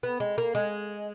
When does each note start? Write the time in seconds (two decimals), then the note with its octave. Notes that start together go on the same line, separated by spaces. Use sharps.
0.03 B3
0.20 G#3
0.38 A#3
0.55 G#3